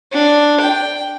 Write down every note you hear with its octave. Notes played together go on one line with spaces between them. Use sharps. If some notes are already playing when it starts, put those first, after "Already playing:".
D4
G5